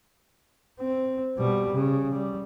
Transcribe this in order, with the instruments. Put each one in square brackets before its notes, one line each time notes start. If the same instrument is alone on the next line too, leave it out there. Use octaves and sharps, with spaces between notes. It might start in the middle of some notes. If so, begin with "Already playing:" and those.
[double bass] C4
B2 G3
C#3
G3